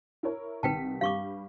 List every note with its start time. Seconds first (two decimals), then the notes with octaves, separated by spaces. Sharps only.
0.23 E4 A#4 C#5
0.63 C2 D#3 B4 G5 A5 B6
1.01 G2 G3 F5 C#6 D6